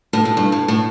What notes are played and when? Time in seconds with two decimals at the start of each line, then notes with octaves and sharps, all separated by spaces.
0.13 A2
0.25 A2
0.37 G2
0.52 A2
0.68 A2